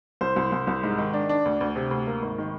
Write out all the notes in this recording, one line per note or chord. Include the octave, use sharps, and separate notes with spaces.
C2 C5
C2
C2
C2
G#2
D#3
D4
D4
D2
D2
C3
D2
A#3
G#1
D#3